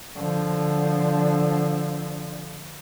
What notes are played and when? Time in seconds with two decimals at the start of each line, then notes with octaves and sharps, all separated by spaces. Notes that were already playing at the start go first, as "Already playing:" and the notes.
0.16 D3 F3